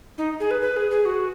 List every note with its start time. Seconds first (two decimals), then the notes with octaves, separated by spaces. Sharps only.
0.18 D#4
0.40 G#4
0.51 B4
0.62 B4
0.77 G#4
0.91 G#4
1.05 F#4